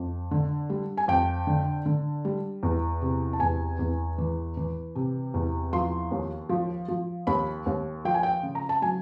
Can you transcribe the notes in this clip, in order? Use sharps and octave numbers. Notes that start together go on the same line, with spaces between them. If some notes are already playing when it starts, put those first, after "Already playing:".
Already playing: F2
D3
G3
G#5
F2 G5
D3
D3
G3
E2
C3
A5
E2 G#5
E2
E3
E3
C3
E2
F3 C6
D#2
F3
F3
D#2 B5
D#2
F3 G5
G#5
G5
C#3
A#5
A5
F#3 G#5